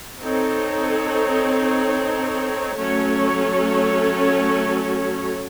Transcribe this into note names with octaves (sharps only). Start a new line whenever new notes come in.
C4 D#4 A4 C#5
F#3 A3 C#4 A4 C#5